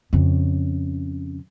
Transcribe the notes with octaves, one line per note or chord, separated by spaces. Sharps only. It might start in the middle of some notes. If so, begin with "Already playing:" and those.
F2 C#3